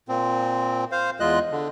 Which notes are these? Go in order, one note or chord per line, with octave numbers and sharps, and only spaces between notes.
A#2 C4
C5 F5
E2 G#3 F4 D#5 F#6
D3